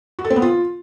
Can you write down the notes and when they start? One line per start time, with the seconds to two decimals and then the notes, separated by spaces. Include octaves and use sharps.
0.19 F#4
0.24 A4
0.30 C4
0.36 B3
0.42 F4